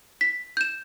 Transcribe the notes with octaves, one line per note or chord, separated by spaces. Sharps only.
B6
G6 E7